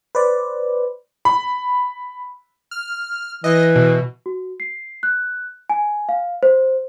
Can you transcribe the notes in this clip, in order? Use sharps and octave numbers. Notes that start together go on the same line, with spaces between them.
B4 C5 D5
B5
F6
E3 D#5
B2
F#4
C7
F#6
G#5
F5
C5